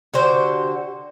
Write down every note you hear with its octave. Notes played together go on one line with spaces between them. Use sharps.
D3 F#4 G4 C5